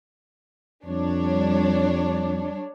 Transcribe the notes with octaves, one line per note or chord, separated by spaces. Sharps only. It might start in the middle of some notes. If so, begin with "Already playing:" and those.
F2 G3 D4 C#5